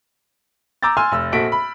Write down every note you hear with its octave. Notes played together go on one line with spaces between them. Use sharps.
A#5 D6 E6 G6 A6
G#5 C6 E6 F6
F1 E6
A#1 F#4 A4 B6 D7
B5